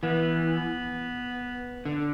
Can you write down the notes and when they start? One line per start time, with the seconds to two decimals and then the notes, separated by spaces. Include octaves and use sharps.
0.03 E3 B3
1.85 D3